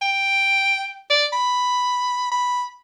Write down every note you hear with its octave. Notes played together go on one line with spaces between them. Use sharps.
G5
D5
B5
B5